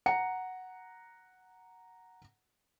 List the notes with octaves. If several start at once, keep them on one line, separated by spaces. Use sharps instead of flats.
F#5 A#5 C#7